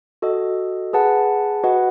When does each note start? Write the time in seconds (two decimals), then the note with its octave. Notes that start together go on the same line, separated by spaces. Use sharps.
0.22 F#4 A4 D#5
0.93 G#4 B4 F#5 A5
1.64 F#4 B4 D#5 F#5